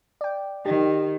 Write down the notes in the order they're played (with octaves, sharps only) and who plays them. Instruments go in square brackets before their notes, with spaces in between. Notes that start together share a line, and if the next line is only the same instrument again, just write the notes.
[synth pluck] D5 G5
[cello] D#3 [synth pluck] G4